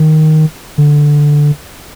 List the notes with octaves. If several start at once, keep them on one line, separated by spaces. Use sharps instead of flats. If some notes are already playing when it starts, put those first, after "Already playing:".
Already playing: D#3
D3